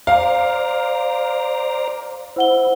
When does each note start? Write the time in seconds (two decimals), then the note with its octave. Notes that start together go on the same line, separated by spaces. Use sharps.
0.07 C5 D5 F5 A#5
2.36 E4 C5 F#5 G7